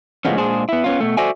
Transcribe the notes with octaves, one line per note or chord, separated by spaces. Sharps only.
A2 C#3 F3 G#3 B3 C#4
A#2 G#3 D4 G#4 C5
B3 E4
B3 C#4 F4
B2 A3
F#4 A4 C5 D5 E5 G#5